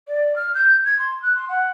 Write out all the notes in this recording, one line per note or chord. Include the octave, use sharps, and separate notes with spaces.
D5
F6
G6
G#6
C6
F#6
C6
F#5